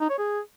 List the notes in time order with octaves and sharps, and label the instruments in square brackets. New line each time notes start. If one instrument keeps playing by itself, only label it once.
[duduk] D#4
C#5
G#4